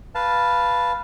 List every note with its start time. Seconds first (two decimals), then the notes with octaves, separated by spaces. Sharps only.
0.15 B4 F5 A5